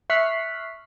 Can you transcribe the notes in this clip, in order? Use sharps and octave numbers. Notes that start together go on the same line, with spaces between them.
E5 C#6 F6 F#6 B6 C7